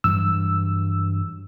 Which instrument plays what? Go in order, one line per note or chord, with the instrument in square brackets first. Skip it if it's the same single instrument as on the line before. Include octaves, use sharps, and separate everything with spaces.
[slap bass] G2 E3 F#3 [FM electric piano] E6